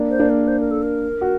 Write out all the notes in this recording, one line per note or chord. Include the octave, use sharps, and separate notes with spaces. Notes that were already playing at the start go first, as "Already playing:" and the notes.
Already playing: A#3 D4
C5
A#3 D4
A#4
C5
A#4
A4
A#4
F#4